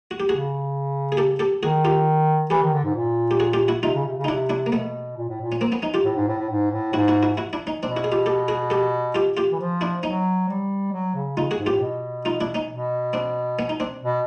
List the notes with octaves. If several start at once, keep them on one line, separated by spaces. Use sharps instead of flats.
F#4
G4
C#3 F#4 G#4
G#4
G4 A4
G4 A4
D#3 F#4 G#4
F4 G4
E3 G4 A4
D#3
D3
G#2
A#2
G4
F#4 G#4
F4 G4
E4 F#4
C3 D#4 F4
C#3
C3
C#3
D#4
C3 D4 E4
D4 E4
A#3
B2 A3 B3
A#2
A2
A#2
C#4
A#3 C4
B3 C#4
C#4 D#4
F4 G4
A2
G#2
A2
A2
G#2
A2
G#2 E4 F#4
E4 F#4
E4 F#4
E4 F#4
D4 E4
C#4 D#4
B2 C4 D4
E4 F#4
G#4
F4 G4
G4 A4
F#4 G#4
G4 A4
F4 G4
F4 G4
E3
F3
D4 E4
F#3 C#4 D#4
G3
F#3
C#3
C#3 D#4 F4
F#4 G#4
G#2
A2 F4 G4
B2
D#4 F4
D4 E4
C#4 D#4
B2
C4 D4
B3 C#4
D#4
C4 D4
B2